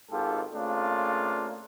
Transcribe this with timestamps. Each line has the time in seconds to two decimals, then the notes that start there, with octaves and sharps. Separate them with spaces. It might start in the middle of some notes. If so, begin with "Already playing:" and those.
0.10 G#1 G#2 F4 G4 A4
0.53 C#3 A3 A#3 C4 D4 F4